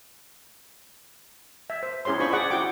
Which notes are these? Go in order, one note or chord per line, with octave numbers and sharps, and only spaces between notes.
E5
C5
C#4 E4 G#4 C#5 C6
D4 F4 C5 B5 C#6
G#4 D5 F#5 C#6 D6
E4 F#4 F#5 G5 D6